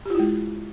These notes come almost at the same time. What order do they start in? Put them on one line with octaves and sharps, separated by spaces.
G4 F4 E4 G#3